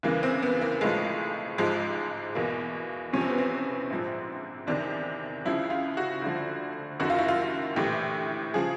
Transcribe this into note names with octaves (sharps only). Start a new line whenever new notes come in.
E2 C#3 E3 A#3
C4
B3
A#3
B1 A2 F3 G#3
A1 G#2 F3 G#3
E2 B2 A#3
E2 C3 F3 C#4
C4
B3
C4
A#1 G#2 F3
E2 C3 D#3 D4
C#2 C#3 F3 E4
F4
F#4
D2 D3 F3
F#1 F#2 D#3 F#4
F4
E4
F4
A#1 A2 E3 G4
C#3 F3 G#4